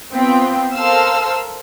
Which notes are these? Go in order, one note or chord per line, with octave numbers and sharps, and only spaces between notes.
B3 C4 F4 G5
A4 A#4 C5 F5 E6 F6